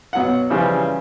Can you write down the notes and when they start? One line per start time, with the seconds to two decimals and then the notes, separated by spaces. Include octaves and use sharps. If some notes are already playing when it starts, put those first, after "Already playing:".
0.13 B2 F#3 F5 F#5
0.50 C#3 E3 F3 G3